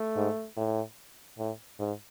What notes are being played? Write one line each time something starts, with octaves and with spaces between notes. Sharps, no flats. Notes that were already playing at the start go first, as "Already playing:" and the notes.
Already playing: A3
G#2
A2
A2
G#2